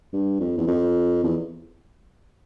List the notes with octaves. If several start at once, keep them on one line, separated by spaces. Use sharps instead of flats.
G2
F2
E2
F2
E2